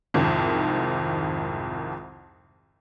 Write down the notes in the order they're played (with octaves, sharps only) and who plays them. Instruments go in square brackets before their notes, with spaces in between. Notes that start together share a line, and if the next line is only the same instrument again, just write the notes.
[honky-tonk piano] C2 F2 G#2 D#3